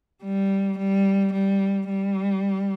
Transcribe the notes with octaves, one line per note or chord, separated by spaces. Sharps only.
G3
G3
G3
G3